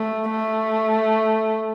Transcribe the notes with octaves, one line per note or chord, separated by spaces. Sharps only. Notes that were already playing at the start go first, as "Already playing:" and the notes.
Already playing: A3
A3